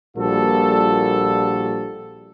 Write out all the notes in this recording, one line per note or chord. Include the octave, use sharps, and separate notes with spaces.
A#1 A#2 G3 F#4 A4